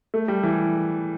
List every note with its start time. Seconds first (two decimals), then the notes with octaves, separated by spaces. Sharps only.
0.14 A3
0.28 G3
0.43 E3